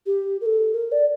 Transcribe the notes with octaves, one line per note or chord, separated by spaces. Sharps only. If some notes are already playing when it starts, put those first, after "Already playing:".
G4
A#4
A4
A#4
D5